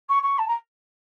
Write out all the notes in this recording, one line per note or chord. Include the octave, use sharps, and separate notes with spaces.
C#6
C#6
A5
A#5